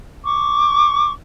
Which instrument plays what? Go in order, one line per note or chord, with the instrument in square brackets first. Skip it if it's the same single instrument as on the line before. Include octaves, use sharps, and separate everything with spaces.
[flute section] C#6 D6